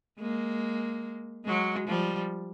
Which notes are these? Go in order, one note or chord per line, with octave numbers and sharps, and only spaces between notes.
G#3 A#3
F#3 G#3
F3 G3